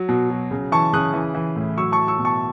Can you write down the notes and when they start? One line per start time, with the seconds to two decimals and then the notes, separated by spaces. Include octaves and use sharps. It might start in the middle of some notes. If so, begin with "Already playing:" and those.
Already playing: F#3
0.09 B2
0.30 F#3
0.51 C#3
0.72 E3 A5 C#6
0.93 C#3 D#6 F#6
1.14 E3
1.34 E3
1.56 A2
1.77 F#3 C#6 E6
1.92 A5 C#6
1.98 F#3
2.08 C#6 E6
2.18 B2
2.25 A5 C#6